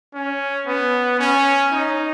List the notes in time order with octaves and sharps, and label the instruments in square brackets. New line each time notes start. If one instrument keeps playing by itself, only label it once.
[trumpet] C#4
B3
C#4
D#4